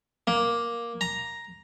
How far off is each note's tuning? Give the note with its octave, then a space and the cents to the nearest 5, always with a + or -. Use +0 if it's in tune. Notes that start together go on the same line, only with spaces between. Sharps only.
A#3 +10
A#5 +5